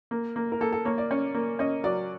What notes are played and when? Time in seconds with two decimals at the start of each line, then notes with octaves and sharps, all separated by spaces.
0.11 A#3
0.36 A#3
0.52 A#4
0.61 A#3 A4
0.72 A4
0.85 A#3 C#5
0.98 D5
1.11 C#4
1.34 A#3
1.59 C#4 D#5
1.84 F#3 D5